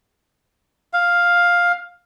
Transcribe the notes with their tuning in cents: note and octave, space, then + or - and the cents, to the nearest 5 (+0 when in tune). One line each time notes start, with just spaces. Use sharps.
F5 +5